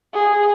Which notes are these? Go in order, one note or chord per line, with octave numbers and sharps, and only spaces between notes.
G#4